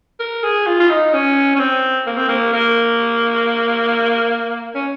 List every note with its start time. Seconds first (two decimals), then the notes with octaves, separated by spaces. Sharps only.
0.19 A#4
0.43 G#4
0.66 F4
0.80 F4
0.90 D#4
1.13 C#4
1.55 C#4
1.59 C4
2.07 A#3
2.17 C4
2.28 A#3
2.53 A#3
4.75 C#4